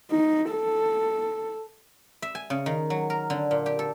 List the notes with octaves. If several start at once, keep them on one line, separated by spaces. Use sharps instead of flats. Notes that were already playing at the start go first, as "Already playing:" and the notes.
D#4
A4
E5
G#5
C#3
D#3
F#3
A#4
D3
A#2
G4
A4